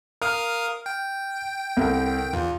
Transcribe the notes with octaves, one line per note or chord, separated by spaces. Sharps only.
A#4 F5 D#6 F6
G5
C2 A4 A#4
E2 F4